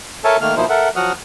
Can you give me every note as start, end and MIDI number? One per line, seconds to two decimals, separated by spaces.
0.24 0.37 69
0.24 0.37 70
0.24 0.37 73
0.24 0.37 76
0.24 0.37 80
0.24 0.37 81
0.41 0.55 51
0.41 0.55 57
0.41 0.55 58
0.41 0.55 89
0.57 0.66 47
0.57 0.66 53
0.57 0.66 58
0.57 0.66 63
0.57 0.66 64
0.57 0.66 72
0.69 0.89 69
0.69 0.89 70
0.69 0.89 76
0.69 0.89 78
0.96 1.12 53
0.96 1.12 54
0.96 1.12 66
0.96 1.12 78
0.96 1.12 87
0.96 1.12 89